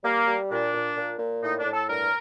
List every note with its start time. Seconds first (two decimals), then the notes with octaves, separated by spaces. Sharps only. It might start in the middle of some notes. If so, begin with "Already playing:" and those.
0.04 G3 A#3
0.27 G3
0.50 A#2 D4
0.74 A#2
0.96 A#2
1.19 A#2
1.42 A2 D#4
1.58 D4
1.66 A2
1.73 A4
1.88 G2 A#4